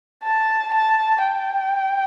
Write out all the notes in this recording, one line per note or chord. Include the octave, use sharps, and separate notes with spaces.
A5
A5
G5